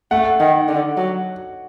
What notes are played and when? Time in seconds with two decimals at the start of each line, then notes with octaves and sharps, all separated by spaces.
0.11 A3 F#5
0.40 D#3
0.69 D3
0.97 F#3